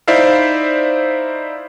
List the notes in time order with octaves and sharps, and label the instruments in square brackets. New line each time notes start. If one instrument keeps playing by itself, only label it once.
[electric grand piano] D#4 E4 C5 D5 E5 F5